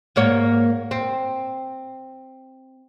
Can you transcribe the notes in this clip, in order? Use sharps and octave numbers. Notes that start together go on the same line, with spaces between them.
G#2 A#3 C#5
C4